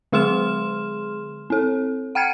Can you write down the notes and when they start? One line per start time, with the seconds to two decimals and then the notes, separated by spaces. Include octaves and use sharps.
0.12 D3 G#3 G#4 C6 F6 E7
1.50 C4 A4
2.15 F#5 G5 F6 G#6 C#7